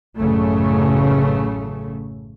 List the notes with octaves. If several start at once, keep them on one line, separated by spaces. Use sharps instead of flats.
A1 F#2 C#3 A3